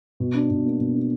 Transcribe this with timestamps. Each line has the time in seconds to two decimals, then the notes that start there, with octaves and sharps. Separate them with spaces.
0.20 B2
0.34 D4
0.50 B2
0.65 A#3
0.80 B2
0.94 D4